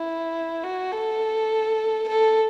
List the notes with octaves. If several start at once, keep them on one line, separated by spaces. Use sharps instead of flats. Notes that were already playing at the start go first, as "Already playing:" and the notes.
Already playing: E4
F#4
A4
A4